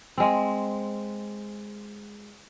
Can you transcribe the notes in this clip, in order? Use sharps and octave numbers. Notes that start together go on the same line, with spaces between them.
G#3 C4